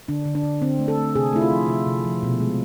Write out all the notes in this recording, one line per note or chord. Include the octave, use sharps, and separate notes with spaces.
D3 D4
D3
D4
D3
D3 C4
A3
A4
A3
C3 G#4
A3 E4
F4
F3
C3
C3
F3
B2
G#3